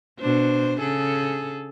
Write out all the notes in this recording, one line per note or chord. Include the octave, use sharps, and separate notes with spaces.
B2 D4 C5
C#3 G#4 A4